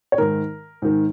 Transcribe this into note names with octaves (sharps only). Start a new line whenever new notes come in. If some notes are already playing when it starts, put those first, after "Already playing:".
C#5
G#2 D#3 A#4
G#2 D#3